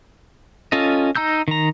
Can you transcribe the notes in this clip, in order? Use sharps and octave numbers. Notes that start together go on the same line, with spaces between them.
C#4 F4 A4 D#5
D#4 A#5 E6 G6
D#3 A#5